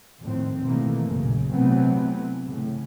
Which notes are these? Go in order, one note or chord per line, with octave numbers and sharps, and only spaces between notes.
F2 A2 D#3 C4
B2 D#3 E3 A3 A#3
A#1 F#2 C#3
C3 E3 F#3 A3 B3 C4
A2 C#3